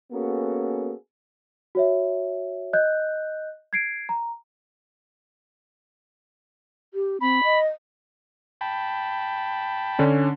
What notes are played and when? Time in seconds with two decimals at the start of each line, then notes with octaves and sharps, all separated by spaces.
0.12 A#3 B3 C#4 F#4 G#4 A4
1.75 F#4 C#5 E5
2.73 D#5 F#6 G6
3.73 G#6 C7 D7
4.09 A#5
6.94 G4
7.21 C4 B5
7.44 D#5
8.61 G5 A5 B5
9.99 D3 C#4 D4